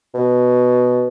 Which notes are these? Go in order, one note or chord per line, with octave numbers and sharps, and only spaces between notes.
B2